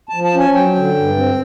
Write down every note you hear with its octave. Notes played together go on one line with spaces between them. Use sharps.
A5
F3
A5
C#4
G#5
F#3 G5
D3
G2
C4